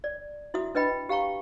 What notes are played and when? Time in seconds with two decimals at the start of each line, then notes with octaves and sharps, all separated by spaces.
0.04 D5
0.54 E4 F#4 E5 D#6
0.75 D4 B4 D#5 G5 B5
1.09 G4 F5 G5 A#5 C#6